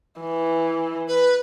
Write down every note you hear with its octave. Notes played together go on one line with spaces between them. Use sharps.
E3
B4